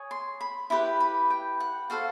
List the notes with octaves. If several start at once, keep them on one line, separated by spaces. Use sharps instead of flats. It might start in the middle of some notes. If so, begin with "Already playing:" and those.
Already playing: G#4 C#5
C6
B5
E4 G4 B4 B5
B5
G5
F#5
F#4 A4 C5 F5